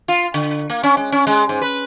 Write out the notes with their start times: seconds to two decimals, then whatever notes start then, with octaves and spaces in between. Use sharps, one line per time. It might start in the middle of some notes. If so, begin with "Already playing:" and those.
0.08 F4
0.34 D3
0.70 A#3
0.83 C#4
0.97 G#3
1.12 C#4
1.27 G#3
1.49 G#2
1.62 B4